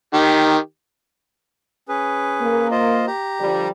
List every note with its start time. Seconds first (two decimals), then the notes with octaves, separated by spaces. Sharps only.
0.14 D#3 G4
1.89 C#4 G#4 B4
2.41 A#3
2.71 F4 C5 D#5
3.07 G4 A#5
3.40 D3 F3 G3